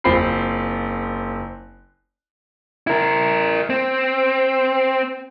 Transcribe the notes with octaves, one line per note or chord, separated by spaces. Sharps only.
F#1 C4 F4 B5 C7
E4 A#4
C4